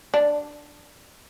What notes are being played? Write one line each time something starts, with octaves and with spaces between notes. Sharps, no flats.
D4